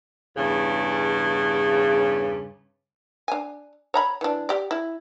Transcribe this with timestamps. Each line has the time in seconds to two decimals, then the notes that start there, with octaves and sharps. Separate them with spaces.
0.37 E2 G2 C#3
3.28 D4 G#5
3.94 C#5 A#5 B5
4.21 E3 D4
4.49 G4 D5
4.71 E4